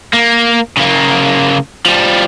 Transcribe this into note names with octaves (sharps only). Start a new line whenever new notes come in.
A#3
C#3 A#3
F3 G3